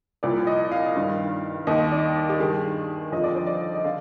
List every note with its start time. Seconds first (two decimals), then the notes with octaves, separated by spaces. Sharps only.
0.23 C2 A#2 F3 D5
0.47 D#5
0.72 F5
0.96 G2 D#3
1.67 D#2 D#3 D#5
1.92 D5
2.29 G4
2.40 G2 D#3 G#4
3.12 F2 D3 F3 D#5
3.24 D5
3.35 C5
3.47 D5
3.76 D#5
3.84 D3 F5